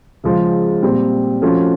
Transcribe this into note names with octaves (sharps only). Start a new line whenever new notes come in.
C#3 F3 G#3
A#2 G3 C4
F3 A3 C#4 F#4